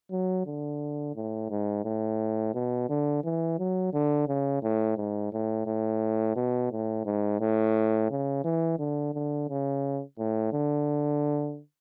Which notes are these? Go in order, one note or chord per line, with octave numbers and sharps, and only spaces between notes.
F#3
D3
A2
G#2
A2
B2
D3
E3
F#3
D3
C#3
A2
G#2
A2
A2
B2
A2
G#2
A2
C#3
E3
D3
D3
C#3
A2
D3